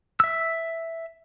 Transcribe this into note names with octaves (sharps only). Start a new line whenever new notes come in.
E5 E6